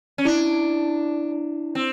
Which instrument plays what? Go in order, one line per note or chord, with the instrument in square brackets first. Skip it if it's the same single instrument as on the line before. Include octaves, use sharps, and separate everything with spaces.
[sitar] C#4
[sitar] D4 [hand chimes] E4
[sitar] C4